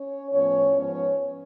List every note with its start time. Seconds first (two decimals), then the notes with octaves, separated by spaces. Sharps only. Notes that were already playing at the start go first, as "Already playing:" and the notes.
Already playing: C#4 C#5
0.32 A2 F3 B3 C#4 C#5
0.74 G#2 F3 B3 C#4 C#5